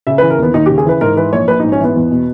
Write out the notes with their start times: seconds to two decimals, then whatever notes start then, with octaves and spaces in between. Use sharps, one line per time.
0.07 C#3 E5
0.18 B4
0.22 E3
0.30 A#4
0.38 D#2 B3
0.54 D#2 D#4
0.66 G4
0.70 C#3
0.78 G#4
0.85 E3 B4
1.01 G#2 A#4
1.17 E3 B4
1.33 A#1 C#5
1.48 A#1 B4
1.60 D#4
1.64 G#2
1.72 C#4
1.79 E3 B3
1.95 E2
2.11 B2